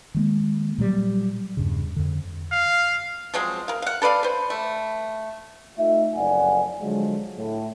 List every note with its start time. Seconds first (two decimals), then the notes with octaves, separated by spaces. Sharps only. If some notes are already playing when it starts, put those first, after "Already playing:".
0.14 D#3 G#3 A#3
0.78 A#2 F#3 G3
1.57 E2 G2 C#3
1.96 F2 D3
2.52 F5
3.34 F3 F#3 G#3 C4
3.68 A#4 F5
3.82 F5 F#5
4.02 A4 B4 D5 F5
4.23 B4 C5
4.50 A3
5.78 A3 D#4 F4 E5
6.15 F#1 F2 D5 F#5 G#5
6.81 D3 F3 F#3 G#3
7.38 A2